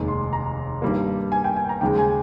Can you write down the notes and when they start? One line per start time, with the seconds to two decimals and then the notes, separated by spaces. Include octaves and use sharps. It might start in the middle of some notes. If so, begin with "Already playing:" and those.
Already playing: F1 D#2 D#3 G#3
0.08 C6
0.33 A#5
0.82 G2 D#3 G3 A#3
1.32 G#5
1.44 G5
1.56 G#5
1.69 A#5
1.81 D#2 C#3 G#3 G5
1.98 G#5